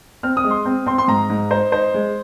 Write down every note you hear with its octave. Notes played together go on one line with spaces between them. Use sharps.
C4 F6
D#6
G#3
C6
C4
C4 C6
C6
G#2 A#5
G#2
D#4 C5
D#4 C5
G#3